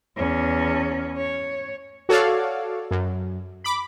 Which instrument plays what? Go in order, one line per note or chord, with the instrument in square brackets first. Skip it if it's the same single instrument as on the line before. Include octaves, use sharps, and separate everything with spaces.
[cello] E2 C#4
C#5
[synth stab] F#4 A4 C#5 D5 F5
F#2
B5 D6